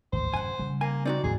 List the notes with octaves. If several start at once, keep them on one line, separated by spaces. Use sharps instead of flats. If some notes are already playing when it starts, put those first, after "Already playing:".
G#1 D2 C#3 C5
F#2 C3 F#5 G#5
C#3 G3
A#3 G#5
C4 D#4 F#4 D5
D2 G#2 E3 G#4